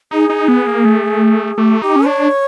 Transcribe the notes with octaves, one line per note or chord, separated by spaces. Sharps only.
D#4 G#4
D#4
B3
A#3
A3
A3 G4
D#4 G4
C#4
D4 C#5